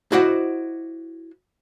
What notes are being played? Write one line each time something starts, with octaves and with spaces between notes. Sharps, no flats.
E4 F#4 C5 D5 D#5 F#5